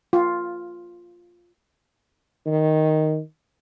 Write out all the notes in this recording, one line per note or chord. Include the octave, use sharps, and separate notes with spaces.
F4
D#3